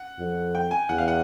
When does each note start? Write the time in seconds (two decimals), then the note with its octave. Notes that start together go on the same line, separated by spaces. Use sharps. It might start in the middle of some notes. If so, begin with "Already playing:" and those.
Already playing: F#5
0.19 F2
0.55 G5
0.71 G#5
0.89 E2 F#5
0.98 F5
1.08 F#5